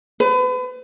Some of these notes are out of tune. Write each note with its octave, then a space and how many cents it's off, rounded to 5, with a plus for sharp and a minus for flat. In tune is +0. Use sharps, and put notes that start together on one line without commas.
B4 +35